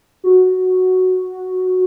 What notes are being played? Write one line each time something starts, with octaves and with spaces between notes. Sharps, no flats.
F#4